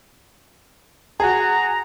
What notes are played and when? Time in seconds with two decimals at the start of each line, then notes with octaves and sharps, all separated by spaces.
1.20 F#4 G#4 A#5